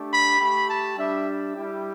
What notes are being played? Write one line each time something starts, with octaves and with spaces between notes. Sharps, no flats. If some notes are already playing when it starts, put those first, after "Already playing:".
Already playing: A3 D4 G4
B5
A3 G4 B5
A5
G3 D4 G4 E5
G3 E4 G4